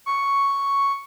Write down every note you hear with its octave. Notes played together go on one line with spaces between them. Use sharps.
C#6